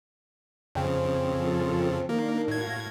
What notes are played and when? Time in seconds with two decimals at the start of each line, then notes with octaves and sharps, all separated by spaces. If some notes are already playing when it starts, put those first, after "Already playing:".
0.75 F2 C#3 C4
1.35 F3 F4 A4
2.09 D#3 A#3 D4 A#4
2.48 A2 F#4 F5 G#6 A#6